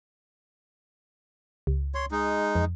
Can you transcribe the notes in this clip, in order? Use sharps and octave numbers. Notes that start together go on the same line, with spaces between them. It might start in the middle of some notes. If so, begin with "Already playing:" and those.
C#2
C#5 C6
G#3 D#4
F2